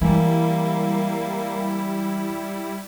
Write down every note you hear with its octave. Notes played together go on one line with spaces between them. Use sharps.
E3 G3 G#3 A#3 E4